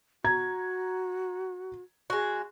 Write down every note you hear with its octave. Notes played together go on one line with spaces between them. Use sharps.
F#4 A#5 G#6
G#3 F#4